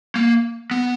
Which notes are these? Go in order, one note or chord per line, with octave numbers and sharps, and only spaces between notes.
A#3
B3